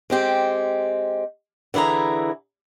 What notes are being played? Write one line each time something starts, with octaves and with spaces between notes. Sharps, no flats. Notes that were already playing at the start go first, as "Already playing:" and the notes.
G#3 C4 G4
D3 E3 E4 G#4 A#5